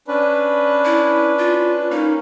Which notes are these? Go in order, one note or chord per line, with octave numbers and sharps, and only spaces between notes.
C#4 D4 B4
E4
F4
A#3 C#4 D#4